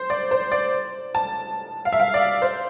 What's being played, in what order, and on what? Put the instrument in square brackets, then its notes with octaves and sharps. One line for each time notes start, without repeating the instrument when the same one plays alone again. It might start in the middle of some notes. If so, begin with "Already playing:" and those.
Already playing: [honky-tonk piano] C5
D5
C5
D5
A5
F5
E5
F5
D5
C5